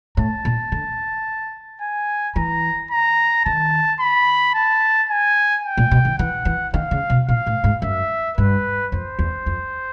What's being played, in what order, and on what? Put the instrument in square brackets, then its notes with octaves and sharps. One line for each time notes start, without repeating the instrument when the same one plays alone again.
[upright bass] A2 [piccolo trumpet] A5
[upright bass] A#2
D3
[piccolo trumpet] G#5
[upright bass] E3 [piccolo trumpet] A#5
[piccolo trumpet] A#5
[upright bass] D#3 [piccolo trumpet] A5
[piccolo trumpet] B5
A5
G#5
G5
[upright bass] A#2
B2
D#3
[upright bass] E3 [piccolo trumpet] F#5
[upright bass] E3
[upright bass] D#3 [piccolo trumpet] F5
[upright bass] C#3
B2
[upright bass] A#2 [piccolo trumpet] F5
[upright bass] A2
G#2
[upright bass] F#2 [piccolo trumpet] E5
[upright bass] G2 [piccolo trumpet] B4
[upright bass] F2 [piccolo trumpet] C5
[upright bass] E2
F2